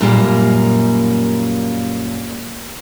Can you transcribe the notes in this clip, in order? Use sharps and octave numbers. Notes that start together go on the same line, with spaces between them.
F#2 A#2 G3 A#3